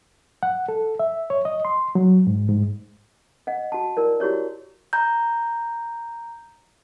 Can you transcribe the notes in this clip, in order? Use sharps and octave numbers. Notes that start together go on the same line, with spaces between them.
F#5
A4
E5
C#5
D#5
C6
F#3
G#2
G#2
D#5 F#5
F#4 A5
E4 A#4 D5
E4 F#4 G4 C#5 D5
A#5 G6